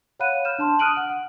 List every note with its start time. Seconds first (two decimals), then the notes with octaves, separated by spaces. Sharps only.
0.20 C#5 F5 F#5 B5 F#6 D#7
0.45 F6 G6 E7
0.58 D4 A5 C6
0.79 D#6 F6 F#6 D7 D#7 F#7
0.97 F#5
1.09 F#5